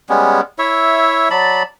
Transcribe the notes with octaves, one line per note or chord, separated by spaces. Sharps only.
G3 G#3 B3 C#4
E4 C#5 E5
F#3 D5 A5 B5